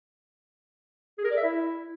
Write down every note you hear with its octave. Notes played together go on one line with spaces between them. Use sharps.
G#4
A#4
D5
E5
E4